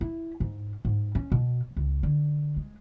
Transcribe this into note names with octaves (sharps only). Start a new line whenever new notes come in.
E4
G#2
G#2
C#4
B2
C#2
D3
G#3